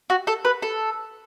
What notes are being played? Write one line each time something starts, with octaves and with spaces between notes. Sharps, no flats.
F#4
A4
B4
A4